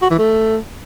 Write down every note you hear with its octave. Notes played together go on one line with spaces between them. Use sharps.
F#4
E3
A3